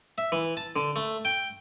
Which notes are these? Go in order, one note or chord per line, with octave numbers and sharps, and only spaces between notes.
E5
E3
A5
D3
A3
G5